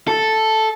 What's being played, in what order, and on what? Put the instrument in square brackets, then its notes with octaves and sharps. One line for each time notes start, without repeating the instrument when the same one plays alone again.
[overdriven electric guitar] A4